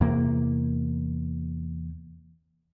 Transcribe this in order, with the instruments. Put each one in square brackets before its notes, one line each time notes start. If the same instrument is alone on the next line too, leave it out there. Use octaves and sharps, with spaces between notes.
[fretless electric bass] E2 C3 A#3